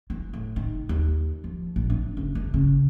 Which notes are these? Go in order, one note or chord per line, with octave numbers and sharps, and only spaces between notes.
E3
A2
D#3
D#2
F3
A#1
D4
F#1
E2
C#3